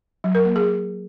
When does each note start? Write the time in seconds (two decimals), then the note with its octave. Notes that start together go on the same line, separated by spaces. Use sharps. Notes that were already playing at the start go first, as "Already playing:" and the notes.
0.24 F#3
0.35 A#4
0.45 A#3
0.56 G#4